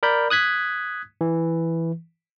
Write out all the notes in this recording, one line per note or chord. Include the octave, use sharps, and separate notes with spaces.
A#4 D5 B5 G6
D#6 F#6 G#6 B6
E3